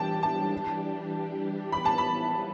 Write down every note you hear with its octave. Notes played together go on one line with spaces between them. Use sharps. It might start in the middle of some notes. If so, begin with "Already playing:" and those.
Already playing: E3 G3 D4 G4 G5 A5
A5
E3 G3 B3 B5
A5
B5